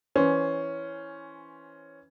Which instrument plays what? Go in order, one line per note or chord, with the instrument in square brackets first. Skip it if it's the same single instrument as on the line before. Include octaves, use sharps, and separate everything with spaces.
[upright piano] E3 C#4 C5